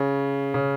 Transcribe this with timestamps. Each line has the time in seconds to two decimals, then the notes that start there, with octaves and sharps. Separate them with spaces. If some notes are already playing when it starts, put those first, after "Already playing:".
Already playing: C#3
0.54 C#3